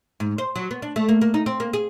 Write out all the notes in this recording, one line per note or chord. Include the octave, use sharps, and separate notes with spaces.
G#2
C5
F#3
B3
D4
A3
A#3
A#3
D#4
C4
A#3
G#4